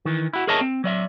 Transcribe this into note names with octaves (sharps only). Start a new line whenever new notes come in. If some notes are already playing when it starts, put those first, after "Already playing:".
D#3 E3
E4 F#4
G#4 A#4 C#5 D#5 E5 A5
C4
F#3 D5 E5